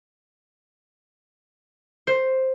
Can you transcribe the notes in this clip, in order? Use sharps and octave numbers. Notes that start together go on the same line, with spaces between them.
C5